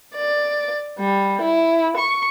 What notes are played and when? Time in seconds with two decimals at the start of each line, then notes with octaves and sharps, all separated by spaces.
0.14 D5
0.98 G3
1.41 E4
1.97 C#6